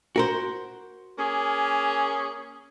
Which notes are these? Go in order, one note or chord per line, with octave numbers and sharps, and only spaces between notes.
F#4 A#4 C5
A#3 C#4 G#4